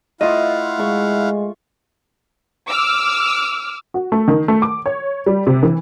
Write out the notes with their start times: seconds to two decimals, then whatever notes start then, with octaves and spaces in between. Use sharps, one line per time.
0.21 A3 E4 F4 D#5 F5 F#5
0.79 G#3 C#6
2.68 D6 E6 F6
3.94 F#4
4.12 A3
4.28 D#3
4.48 A3
4.62 D6
4.86 C#5
5.26 G3
5.47 C3
5.63 E3